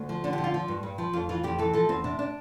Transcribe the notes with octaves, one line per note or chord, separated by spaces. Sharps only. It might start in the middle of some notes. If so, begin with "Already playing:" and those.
Already playing: D2
F3
D3 D4
G4
F3
F4
F3
G2
G2
F3
F2 F4
E3 F4
F2 G4
E3 A4
F3 A4
E2 C4
C3 D4
D4